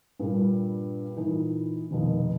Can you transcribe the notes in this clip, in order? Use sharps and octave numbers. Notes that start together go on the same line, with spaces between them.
G2 A#2 G3
A#2 E3 D#4
F1 D#2 B2